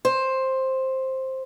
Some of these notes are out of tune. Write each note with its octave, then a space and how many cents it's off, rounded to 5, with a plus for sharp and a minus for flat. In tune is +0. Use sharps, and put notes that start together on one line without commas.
C5 +10